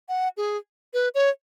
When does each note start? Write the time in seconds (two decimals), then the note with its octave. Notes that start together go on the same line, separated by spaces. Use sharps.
0.09 F#5
0.37 G#4
0.94 B4
1.15 C#5